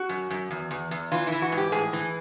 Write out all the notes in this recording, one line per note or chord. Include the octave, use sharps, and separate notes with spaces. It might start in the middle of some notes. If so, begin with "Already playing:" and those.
Already playing: F#4
F#2
F#2
E2
E2
E2
E3 F4
E4
E3
F#4
G#2
G4
A2 G#4
E3